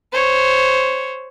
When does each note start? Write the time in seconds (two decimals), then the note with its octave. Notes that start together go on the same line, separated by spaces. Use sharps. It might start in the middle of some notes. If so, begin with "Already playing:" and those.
0.12 C5 C#5